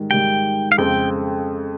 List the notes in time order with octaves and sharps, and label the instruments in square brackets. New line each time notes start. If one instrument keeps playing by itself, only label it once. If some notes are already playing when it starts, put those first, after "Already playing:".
Already playing: [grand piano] G#2 D#3 G3
[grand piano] G#2 D#3 G3 [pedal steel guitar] G5
[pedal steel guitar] F5
[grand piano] F2 C#3 G#3 C4 [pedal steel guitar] G5